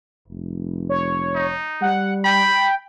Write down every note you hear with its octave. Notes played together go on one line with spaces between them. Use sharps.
F1
C#5
D#4
G3 F#5
G5 B5